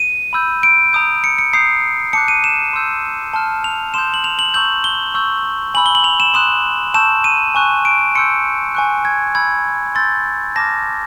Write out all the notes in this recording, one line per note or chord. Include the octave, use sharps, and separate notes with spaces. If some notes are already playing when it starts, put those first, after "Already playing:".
Already playing: D#7
B5 E6 G6
D7
A#5 D#6 G6
C#7
C#7
A#5 D#6 G6 C7
A5 D6 F#6 C#7
D#7
E7
C6 E6 G6
A5 C6 F6
F7
C6 D#6 G6 E7
F#7
F7
F#7
A#5 C#6 E6 G6 F#7
G7
C#6 E6 G6
G#5 B5 E6 F#7
G7
F#7
F7
E7
C6 D#6 F#6 E7
A5 C#6 E6 G6 E7
D#7
G#5 C#6 F#6
D7
C6 E6 G6 C#7
G#5 C#6 F#6
G#6
B5 E6 G6 G#6
C6 E6 G6 A6
A5 D6 F6 A#6